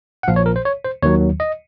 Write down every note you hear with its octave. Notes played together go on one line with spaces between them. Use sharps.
F#5
A#1 A#2 F3 F5
C#5
A#4
C5
C#5
C5
D#2 D#3 F#3 C#5
D#5